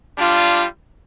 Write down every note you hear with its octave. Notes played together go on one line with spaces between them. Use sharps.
G3 D4 F4